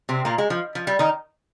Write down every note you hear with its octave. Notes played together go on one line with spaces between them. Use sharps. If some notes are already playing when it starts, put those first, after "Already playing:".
C3 C4
A#2 A#3
G#3
F3
F3
G3
D#3 D#4